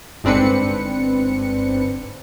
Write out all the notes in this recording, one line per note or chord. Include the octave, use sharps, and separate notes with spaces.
G1 G#2 C4 D4 B4 C#7